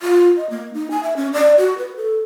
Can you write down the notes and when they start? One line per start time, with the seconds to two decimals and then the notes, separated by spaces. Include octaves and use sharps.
0.02 F4
0.37 D#5
0.50 A#3
0.74 D#4
0.91 G#5
1.03 E5
1.17 C#4
1.33 D5
1.58 F#4
1.78 B4
1.96 A4